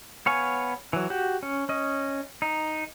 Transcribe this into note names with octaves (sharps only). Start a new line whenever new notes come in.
B3 C#5 F5 G#5
E3 F#3
F#4 G4
C#4
C#4 D#5
D#4